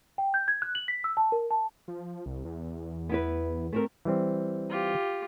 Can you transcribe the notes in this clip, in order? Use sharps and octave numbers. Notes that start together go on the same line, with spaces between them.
G5
G6
G#6
F#6
F#7
B6
E6
A5
A#4
A5
F3
C2
E2
B3 E4 B4
A3 C4 A#4
E3 G3 C4
F4 G4